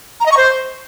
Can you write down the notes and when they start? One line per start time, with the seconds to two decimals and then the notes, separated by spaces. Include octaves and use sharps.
0.20 A#5
0.26 D#5
0.32 C#6
0.37 C5